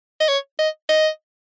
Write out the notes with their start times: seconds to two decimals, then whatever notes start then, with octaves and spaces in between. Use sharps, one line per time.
0.20 D#5
0.28 C#5
0.59 D#5
0.89 D#5